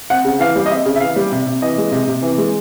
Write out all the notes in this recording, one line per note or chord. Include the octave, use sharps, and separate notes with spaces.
C4 F#5
C#3
E3 F5
G3
D#5
C4 E5
C#3
E5
E3 F5
G3
C3
C3
E3 D#5
G#3
C3
C3
E3
G#3